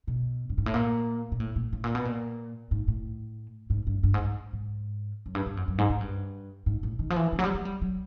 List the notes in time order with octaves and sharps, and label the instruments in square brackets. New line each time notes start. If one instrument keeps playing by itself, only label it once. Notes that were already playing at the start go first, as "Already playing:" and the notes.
[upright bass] B2
G2
G#2
A2
A#2
A#2
A2
A#2
A2
A#2
B2
A#2
G#2
A2
G#2
G2
G2
G#2
G#2
G#2
F#2
G2
G2
F#2
F#2
G#2
G#2
G2
G#2
A2
D#3
F3
E3
D3
F#3
G3
G#3
G3
F#3